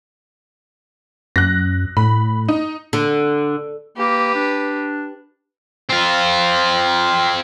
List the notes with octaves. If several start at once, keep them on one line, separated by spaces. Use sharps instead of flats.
F#2 F#6 A#6
A2 B5
D#4
D3
A#3 G4 B4
D4
C4 F4